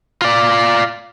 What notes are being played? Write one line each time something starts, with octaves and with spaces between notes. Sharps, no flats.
F4 D5